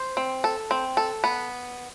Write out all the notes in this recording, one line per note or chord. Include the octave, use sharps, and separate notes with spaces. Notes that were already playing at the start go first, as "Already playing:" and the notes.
Already playing: C5
C4
A4
C4
A4
B3